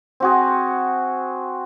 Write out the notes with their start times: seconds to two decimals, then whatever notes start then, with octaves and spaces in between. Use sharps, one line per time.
0.20 C4 F#4 G#4